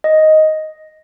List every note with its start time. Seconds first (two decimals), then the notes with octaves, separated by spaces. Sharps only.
0.04 D#5